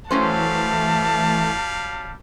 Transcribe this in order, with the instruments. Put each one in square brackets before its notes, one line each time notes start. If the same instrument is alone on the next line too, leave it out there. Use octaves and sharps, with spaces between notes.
[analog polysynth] E3 A3 [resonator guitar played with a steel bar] F#3 C#4 C5 [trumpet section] G3 F5 [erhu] A5